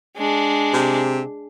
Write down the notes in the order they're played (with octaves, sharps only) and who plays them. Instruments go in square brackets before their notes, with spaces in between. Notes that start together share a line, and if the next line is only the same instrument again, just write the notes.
[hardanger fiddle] G#3 D4
[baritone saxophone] C3